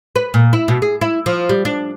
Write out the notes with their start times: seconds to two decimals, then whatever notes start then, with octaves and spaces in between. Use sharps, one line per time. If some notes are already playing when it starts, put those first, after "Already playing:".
0.16 B4
0.34 A#2
0.53 E4
0.68 B2
0.82 G#4
1.01 E4
1.26 F3
1.49 G3
1.65 D4